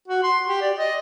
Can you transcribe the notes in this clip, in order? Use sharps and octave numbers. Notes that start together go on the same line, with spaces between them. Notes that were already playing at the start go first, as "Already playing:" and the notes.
F#4
C6
G4
D5
D#5